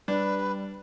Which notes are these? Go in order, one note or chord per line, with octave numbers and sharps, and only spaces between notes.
G3 D4 B4